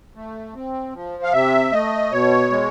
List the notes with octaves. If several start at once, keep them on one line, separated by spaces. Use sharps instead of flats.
A3
C4
F3
F5
C3 E5
A3 D#5
B2 C#5
G#3